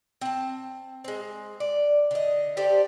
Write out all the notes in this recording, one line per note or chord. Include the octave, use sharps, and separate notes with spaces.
C4 A5
G#3 C4
D5
D3 D#5
G4 A4 C5 D5